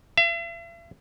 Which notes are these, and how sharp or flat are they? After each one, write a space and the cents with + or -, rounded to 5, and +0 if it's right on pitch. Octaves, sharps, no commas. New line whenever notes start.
E5 +45